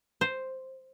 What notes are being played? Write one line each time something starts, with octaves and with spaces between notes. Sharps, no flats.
C5